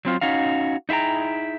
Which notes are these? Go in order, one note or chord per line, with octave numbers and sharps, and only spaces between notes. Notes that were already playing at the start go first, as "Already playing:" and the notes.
F#3 C4 F4
C#4 D#4 F#4 F5
D#4 E4 G#4 G5 A#5